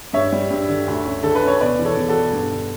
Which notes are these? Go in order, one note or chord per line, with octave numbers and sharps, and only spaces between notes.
G2 C#5 E5
G3
G2
D3
D2
C#4
D3 A4
B4
C#4 C#5
B2 B4 D5
E2
A4 C#5
E2
F#4 A4
B2
G2
D3